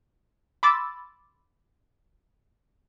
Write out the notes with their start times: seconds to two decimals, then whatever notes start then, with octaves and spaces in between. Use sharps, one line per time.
0.63 B5 C6 D6 E6 A6